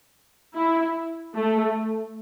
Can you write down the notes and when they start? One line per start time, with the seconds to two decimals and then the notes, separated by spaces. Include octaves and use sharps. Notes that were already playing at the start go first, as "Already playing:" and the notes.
0.56 E4
1.36 A3